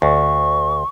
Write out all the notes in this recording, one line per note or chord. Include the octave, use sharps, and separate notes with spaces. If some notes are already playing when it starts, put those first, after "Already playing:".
D2 C#6